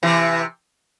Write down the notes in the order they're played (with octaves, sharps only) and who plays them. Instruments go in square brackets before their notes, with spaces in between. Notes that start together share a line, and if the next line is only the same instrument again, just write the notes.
[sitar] C3 E3